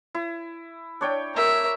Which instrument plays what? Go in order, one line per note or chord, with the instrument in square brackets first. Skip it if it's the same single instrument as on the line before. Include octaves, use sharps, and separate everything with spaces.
[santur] E4
D4 C#5 G5
[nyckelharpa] A#4 E5